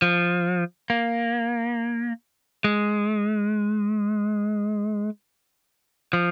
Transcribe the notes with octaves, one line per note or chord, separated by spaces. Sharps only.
F3
A#3
G#3
F3